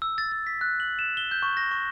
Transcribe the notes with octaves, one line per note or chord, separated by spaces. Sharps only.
E6
A6
A6
B6
F#6
F#7
E7
G7
G6
C#6
A#6
C#6